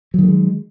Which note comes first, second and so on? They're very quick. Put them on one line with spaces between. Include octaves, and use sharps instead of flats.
F#3 D#3 A3 G#3